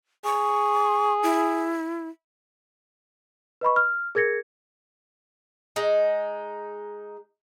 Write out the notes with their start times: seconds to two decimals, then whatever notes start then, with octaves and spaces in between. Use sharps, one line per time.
0.25 G#4 C#6
1.23 E4
3.61 B4 D#5 B5 C#6
3.76 F6
4.15 G#4 A#4 G#6 A#6 C#7
5.76 G#3 D#4